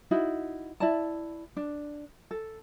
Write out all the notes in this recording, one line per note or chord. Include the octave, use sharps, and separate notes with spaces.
D#4 E4 F#4
E4 D5 A5
D4
A4